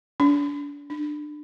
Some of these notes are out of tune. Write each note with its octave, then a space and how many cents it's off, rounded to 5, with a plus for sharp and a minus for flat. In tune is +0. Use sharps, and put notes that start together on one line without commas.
D4 -35
D4 +25